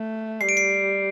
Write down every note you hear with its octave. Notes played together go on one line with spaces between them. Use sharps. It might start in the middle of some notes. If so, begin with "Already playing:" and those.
Already playing: A3
G3 C7
D7
C7